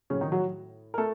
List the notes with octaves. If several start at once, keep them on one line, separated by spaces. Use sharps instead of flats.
A2 C#3 F#3 C#4
D#3 D#4
F#3 F#4
A#4
A3 A4